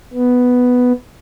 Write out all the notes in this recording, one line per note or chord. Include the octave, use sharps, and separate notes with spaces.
B3